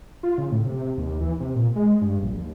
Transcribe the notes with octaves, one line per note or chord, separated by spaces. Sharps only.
F4
C#3
A2
C3
D#2
E3
C3
A#2
G#3
G2
A#1
D#2